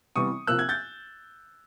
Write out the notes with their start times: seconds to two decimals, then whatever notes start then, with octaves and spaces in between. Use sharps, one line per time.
0.16 C3 E3 G3 B3 C#6 D#6
0.47 C3 F3 A#3 E6 F#6
0.59 F#6 G#6
0.69 G6 A6